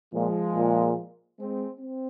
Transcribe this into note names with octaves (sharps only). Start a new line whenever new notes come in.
A#2 F3 G#3
A#2
G#3 C4
C4